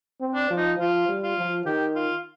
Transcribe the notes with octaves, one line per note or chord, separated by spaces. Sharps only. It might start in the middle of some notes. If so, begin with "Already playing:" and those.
C4
D4
F3
D#4
F3 F4
G3
F4
F3
D#3 G4
F4